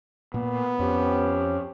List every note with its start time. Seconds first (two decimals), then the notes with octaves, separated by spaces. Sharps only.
0.34 A#2 A#3 B3
0.79 F2 F3 C#4 G4